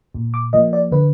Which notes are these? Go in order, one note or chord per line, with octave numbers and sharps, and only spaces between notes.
A#2
D6
F3 A#3 D#5
D5
D3 B4